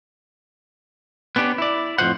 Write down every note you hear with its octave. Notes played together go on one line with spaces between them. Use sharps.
B3 C#4 D4 G4
E4 D5
F2 A2 D#3 F4 C5 F#5